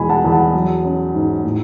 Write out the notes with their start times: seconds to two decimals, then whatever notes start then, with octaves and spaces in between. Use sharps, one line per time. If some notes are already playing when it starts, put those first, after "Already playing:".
Already playing: E2 B2 G#3 G#5 B5
0.09 F#5 A5
0.24 E2
0.32 F#5 A5
0.53 F#3
0.84 C#4
1.14 G#2
1.44 A2